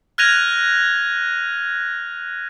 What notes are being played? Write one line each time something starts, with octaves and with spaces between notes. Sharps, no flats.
F6 F#6 G#6 A#6 D#7 F7